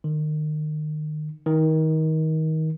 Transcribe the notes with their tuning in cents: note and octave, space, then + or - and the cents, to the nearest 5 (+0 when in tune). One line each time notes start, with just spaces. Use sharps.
D#3 -30
D#3 +25